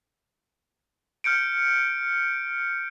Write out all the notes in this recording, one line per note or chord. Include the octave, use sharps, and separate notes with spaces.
F6 G6 C#7 D7